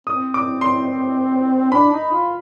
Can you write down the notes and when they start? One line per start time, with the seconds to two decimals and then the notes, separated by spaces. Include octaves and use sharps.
0.07 C4 D#6
0.34 D6
0.61 C6
1.72 D4 B5
1.93 D#4
2.12 F4